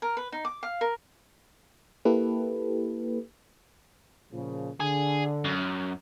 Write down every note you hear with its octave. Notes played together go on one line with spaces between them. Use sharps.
A#4
B4
D#4
D6
F5
A#4
A#3 E4 G4 A4 B4
A#2 C#3 F3
D3 G#4
F#2